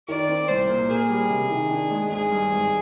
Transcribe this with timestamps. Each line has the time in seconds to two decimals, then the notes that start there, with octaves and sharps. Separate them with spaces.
0.09 D#3 D5
0.29 C4
0.48 C2 C5
0.69 A#2
0.89 A#3 G#4
1.09 G3
1.30 C3
1.50 D#3
1.70 D4
1.90 G#3
2.11 G#1 G#4
2.31 G2
2.51 G#1